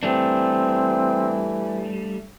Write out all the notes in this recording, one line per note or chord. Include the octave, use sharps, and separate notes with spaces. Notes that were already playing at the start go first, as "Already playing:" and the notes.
E3 G3 A3 C4 D4